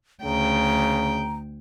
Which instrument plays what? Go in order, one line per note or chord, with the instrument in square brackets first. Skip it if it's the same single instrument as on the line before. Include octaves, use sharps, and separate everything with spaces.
[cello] D2 G5 [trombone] C#3 [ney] A#5